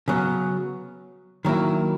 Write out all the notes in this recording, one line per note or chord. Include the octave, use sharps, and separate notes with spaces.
C#3 F#3 B3
D#3 F#3 A#3 E4